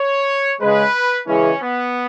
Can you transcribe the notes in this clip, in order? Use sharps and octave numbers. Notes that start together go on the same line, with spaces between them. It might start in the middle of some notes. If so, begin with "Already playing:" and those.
Already playing: C#5
C#3 G#3 B4
C#3 E3 G#3 C#4
B3